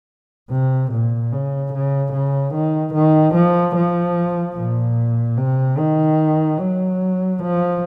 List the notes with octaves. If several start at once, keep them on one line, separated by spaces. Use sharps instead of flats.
C3
A#2
C#3
C#3
C#3
D#3
D#3
F3
F3
A#2
C3
D#3
F#3
F3